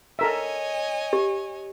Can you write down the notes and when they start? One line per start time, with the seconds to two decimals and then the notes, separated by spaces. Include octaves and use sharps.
0.19 A4 A#4 C#5 D#5 E5 G#5
1.13 G4